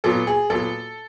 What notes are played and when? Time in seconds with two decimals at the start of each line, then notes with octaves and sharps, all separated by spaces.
0.04 A#2 F#3 B3 A4
0.27 G#4
0.50 A#2 F#3 B3 A4